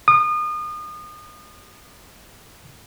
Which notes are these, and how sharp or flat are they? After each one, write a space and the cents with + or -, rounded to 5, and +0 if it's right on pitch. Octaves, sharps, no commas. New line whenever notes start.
D#6 -35